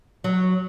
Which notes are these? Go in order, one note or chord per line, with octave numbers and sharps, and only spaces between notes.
F#3